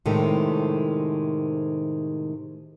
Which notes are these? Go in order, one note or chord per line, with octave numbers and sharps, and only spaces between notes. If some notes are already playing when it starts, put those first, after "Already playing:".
A2 C3 D#3 G#3 A3